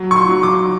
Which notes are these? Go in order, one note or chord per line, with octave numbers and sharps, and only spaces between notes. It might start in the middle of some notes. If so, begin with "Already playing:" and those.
Already playing: F#3
C#6
C6
F#3
D6